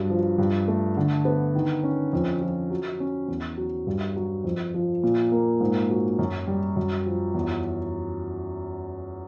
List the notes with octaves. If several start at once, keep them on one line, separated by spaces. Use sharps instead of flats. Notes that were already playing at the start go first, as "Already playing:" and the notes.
Already playing: G2 F#3
F3
G2
A3
D3
B3
D#3
C#4
F2
F3
F#3
C#4
E2
F#3
G2
F#3
F2
F3
A#2
A#3
G#2
F#3
F#2
G3
F#2
F3
E2